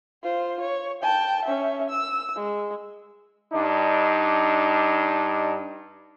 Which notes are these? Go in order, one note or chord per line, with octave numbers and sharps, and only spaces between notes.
F4 C5
C#5
G5 A5
C#4 E5
E6
G#3
G2 D4 D#4